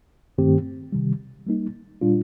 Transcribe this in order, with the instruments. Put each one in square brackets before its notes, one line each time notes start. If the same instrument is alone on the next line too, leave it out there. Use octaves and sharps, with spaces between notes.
[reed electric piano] G2 D#3 A3 C4 G4
C3 D#3 G3
G3 A#3 D#4
A#2 G3 D4 F4